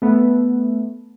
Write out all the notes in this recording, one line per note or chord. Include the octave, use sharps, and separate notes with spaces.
A3 B3